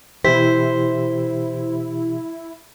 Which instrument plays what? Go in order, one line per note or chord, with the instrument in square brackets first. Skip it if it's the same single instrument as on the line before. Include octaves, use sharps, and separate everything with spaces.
[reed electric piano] B2 E3 G4 [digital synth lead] E4 [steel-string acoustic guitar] C5 [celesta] B6